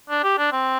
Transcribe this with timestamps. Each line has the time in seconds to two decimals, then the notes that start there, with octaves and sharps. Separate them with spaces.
0.10 D4
0.23 G4
0.38 D4
0.52 C4